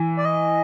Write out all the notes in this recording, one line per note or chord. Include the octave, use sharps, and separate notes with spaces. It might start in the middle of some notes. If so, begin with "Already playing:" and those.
Already playing: E3
D5
D#5